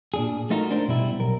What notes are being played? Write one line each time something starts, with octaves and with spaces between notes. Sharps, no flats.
A#2 D4 G#4
A3 D#4 F4 F#4 A#4
D4 A#4 C5
B2 G3 E4
B1 A#4